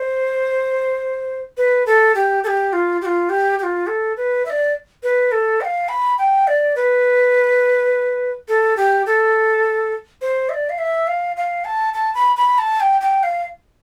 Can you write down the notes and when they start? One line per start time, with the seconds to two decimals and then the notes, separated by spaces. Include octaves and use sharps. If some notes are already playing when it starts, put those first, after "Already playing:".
Already playing: C5
1.57 B4
1.86 A4
2.15 G4
2.44 A4
2.47 G4
2.73 F4
3.01 G4
3.06 F4
3.29 G4
3.59 G4
3.63 F4
3.87 A4
4.17 B4
4.46 E5
4.50 D5
5.03 B4
5.32 A4
5.61 G5
5.65 F5
5.89 B5
6.18 G5
6.47 D5
6.76 B4
8.48 A4
8.77 G4
9.06 A4
10.22 C5
10.49 E5
10.53 D5
10.69 F5
10.78 E5
11.07 F5
11.37 F5
11.65 A5
11.94 A5
12.15 B5
12.37 B5
12.58 A5
12.80 G5
13.01 G5
13.23 F5